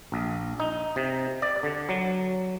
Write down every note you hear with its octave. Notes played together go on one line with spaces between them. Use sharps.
A#1
D#4
C3
D5
D3
F#3